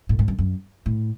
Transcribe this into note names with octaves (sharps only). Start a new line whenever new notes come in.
A2
G#2
F#2
F#2
A2